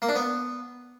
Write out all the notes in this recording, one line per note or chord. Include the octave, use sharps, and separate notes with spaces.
A#3
D4
B3